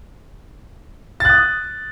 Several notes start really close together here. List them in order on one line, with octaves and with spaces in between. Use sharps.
A6 F#6 D#6